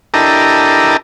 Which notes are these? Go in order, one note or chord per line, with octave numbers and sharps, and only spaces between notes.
D4 E4 G4 A4 A#4 D#5